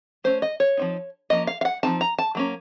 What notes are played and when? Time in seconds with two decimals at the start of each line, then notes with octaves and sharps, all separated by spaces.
0.24 A3 C#4 C5
0.42 D#5
0.60 C#5
0.77 F3 C4 D#4
1.30 F3 A#3 C#4 D#5
1.47 F5
1.61 F5
1.65 F#5
1.83 F3 C4 D#4 A5
2.01 A#5
2.18 A5
2.35 F#3 A#3 C#4